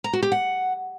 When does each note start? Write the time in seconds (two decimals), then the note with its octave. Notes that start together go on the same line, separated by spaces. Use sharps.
0.04 A#5
0.13 F#4
0.23 G4
0.32 F#5